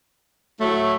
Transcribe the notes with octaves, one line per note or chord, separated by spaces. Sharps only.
A2 F#3 A3